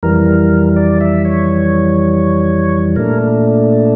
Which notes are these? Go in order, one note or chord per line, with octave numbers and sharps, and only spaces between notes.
F2 E3 G3 A#4
D5
E5
C#5
A#2 A3 D4 A#4